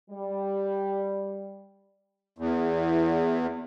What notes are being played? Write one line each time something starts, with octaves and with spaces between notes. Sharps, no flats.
G3
E2